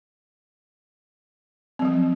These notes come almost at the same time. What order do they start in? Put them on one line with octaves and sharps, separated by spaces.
C4 F3 F#3